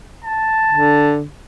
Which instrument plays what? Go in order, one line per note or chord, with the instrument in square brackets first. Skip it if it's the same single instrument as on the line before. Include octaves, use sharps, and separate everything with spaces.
[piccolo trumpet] A5
[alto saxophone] D3